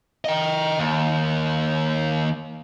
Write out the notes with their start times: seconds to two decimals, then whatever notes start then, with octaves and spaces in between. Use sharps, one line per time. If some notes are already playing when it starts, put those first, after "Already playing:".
0.25 D#5 G5
0.78 D#2